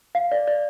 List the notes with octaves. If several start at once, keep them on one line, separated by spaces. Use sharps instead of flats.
F5
D5
D5